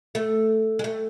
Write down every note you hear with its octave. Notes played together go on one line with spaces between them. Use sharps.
A3
G#3
A3